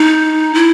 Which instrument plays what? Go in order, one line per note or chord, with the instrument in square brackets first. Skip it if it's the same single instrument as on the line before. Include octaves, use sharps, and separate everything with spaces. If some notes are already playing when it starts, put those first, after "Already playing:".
Already playing: [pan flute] D#4
E4